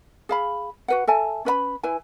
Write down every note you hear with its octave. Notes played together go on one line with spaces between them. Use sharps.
G#4 F5 B5
F#4 B4 F#5
A4 E5 G#5 A5
C#4 B4 D#5 B5
E4 B4 G#5